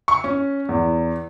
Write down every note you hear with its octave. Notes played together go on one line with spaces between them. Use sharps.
C#6
C#4
E2